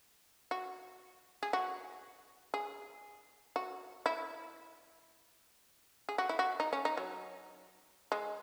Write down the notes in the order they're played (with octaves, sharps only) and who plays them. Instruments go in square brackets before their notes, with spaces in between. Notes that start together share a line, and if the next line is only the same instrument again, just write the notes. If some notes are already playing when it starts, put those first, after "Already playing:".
[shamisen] F#4
G#4
F#4
G#4
F#4
E4
G#4
F#4
E4
F#4
D#4
C#4
D#4
F#3
G#3